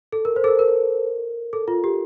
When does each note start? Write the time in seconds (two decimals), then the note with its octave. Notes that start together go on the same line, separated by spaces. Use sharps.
0.12 A4
0.25 A#4
0.36 C5
0.44 A4
0.48 A#4
0.59 A#4
1.53 A4
1.68 F4
1.84 G4